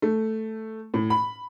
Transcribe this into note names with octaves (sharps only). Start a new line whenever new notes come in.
A3
A2
B5